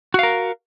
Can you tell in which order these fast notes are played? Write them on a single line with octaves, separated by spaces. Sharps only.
F#4 F5 A#4